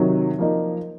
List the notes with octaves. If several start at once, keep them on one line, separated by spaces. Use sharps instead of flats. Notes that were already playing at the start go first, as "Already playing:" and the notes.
Already playing: C3 D#3 F#3
F3 A#3 D#4